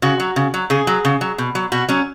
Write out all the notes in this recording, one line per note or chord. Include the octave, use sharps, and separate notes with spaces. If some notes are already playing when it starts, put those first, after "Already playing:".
C#3 F#4
F#3
C#3
F#3
C#3 G#4
F#3
C#3
F#3
B2
F#3
B2 F#4
F#3 C#4